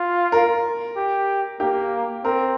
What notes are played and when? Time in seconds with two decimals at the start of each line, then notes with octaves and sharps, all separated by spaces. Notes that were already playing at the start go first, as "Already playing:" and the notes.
Already playing: F4
0.32 A#4
0.96 G4
1.60 A#3 G4
2.24 C4 A#4